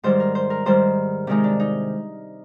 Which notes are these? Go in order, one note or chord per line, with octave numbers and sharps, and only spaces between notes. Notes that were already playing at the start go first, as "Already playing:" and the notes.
G#2 D#3 G3 C5
A#4
C5
A#4
G#2 D#3 G3 C5
C3 D#3 G#3 D#4
D4
D#4